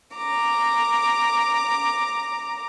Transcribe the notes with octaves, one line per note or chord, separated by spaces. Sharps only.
A#5 D6